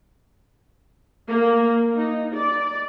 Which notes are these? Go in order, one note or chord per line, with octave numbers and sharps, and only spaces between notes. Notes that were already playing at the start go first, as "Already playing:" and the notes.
A#3
D#4
D5